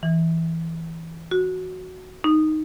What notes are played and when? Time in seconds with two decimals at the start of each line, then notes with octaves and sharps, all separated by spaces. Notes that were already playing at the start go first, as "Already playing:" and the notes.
0.03 E3
1.31 F#4
2.24 D#4